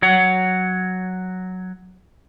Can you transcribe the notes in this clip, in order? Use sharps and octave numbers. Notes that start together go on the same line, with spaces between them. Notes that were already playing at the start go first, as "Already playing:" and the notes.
F#3 C#5 F#5